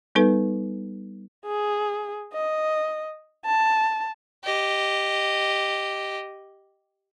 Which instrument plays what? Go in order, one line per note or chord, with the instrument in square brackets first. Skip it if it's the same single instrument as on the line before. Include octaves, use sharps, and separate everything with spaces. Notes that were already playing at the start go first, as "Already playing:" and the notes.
[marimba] G3 B3 D#4 A4 B4
[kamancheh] G#4
D#5
A5
[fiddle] G4 D#5